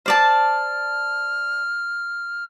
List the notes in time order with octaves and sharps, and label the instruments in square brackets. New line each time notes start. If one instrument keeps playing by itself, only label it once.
[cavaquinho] C5 D5 A5 [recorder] F6